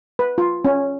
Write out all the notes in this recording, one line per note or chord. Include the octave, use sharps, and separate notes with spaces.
B4
F4
C#4